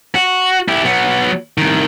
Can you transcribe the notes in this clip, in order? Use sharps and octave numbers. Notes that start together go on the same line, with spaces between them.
F#4
E4 G4
F#3 B3
C2 D#3